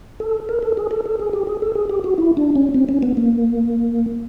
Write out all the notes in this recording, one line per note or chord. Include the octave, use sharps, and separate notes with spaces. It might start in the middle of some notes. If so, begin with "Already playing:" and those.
A4
A#4
A4
G#4
A4
A4
G#4
G4
G#4
A4
G#4
G4
F#4
E4
D4
C#4
C4
C#4
B3
A#3